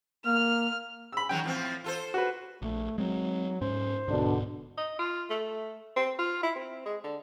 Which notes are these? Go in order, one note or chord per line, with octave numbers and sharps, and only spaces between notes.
A#3 F6
B5 E6
D#3 F#3 C#4 G5
A2 F3 C4
F4 A4 C5
F#4 B4
A#1 A3
F#3 G#3 C4
G#2 C#4 C5
D1 G#2 B2 D3 D4
D#5
F4
A3
C4
F4
E4
C4
G#3
D3